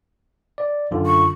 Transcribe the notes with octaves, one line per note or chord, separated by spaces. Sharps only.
D5
F#2 D3 F4
C#6